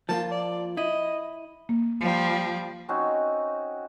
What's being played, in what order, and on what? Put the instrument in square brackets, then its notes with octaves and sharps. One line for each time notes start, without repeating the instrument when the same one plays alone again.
[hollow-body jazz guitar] F3 A#3 F4 [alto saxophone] A5
[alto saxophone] D5
[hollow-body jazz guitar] E4 [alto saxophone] D#5
[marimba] A#3
[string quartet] F3 G3
[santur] C4 C#4 D#4 F#4